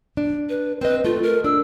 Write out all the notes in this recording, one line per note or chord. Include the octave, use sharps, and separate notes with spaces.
D4
B4
C4 B4 D#5
A3 F4
A#4
D4 E6